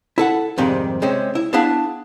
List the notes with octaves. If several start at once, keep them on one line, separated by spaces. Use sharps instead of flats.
E4 A4 F#5
F2 G#2 C3 D#3 G3
C3 G#3 C4 C#4
E4
B3 D4 E4 G#4 F5 A5